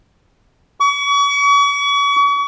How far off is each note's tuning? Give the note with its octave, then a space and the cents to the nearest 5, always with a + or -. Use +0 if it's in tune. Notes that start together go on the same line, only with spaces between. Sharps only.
C#6 +40